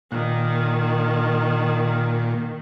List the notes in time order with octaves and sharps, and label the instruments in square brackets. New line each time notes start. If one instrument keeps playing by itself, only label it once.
[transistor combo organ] A#2 [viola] D#3